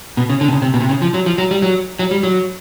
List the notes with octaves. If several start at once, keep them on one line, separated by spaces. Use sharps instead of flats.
B2
C#3
D3
C3
C#3
C3
B2
C3
C#3
F3
F#3
F3
F#3
G3
F#3
F#3
G3
F#3